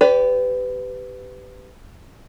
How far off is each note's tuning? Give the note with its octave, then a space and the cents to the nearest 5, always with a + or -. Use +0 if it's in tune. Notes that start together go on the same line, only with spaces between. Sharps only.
G4 +0 B4 +25 D5 -30